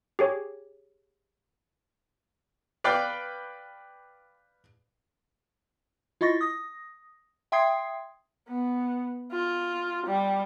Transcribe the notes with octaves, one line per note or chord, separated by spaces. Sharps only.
G4 G#4 C#5
B4 D5 F5 G5
E4 F4 D#5 C#6 A6 A#6
D#6 A#6
E5 G5 C6 D#6 G#6 C7
B3
F4
G3